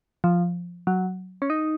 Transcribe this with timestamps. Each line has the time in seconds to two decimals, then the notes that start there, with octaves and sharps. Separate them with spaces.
0.24 F3
0.87 F#3
1.42 C#4
1.50 D#4